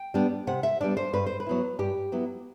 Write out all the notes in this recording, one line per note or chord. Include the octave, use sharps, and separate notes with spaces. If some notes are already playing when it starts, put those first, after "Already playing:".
Already playing: G5
G3 B3 D4
C3 F#5
E5
G3 B3 D4 D5
C5
G2 B4
C5
B4
F#3 B3 E4
G2 G4
F#3 B3 E4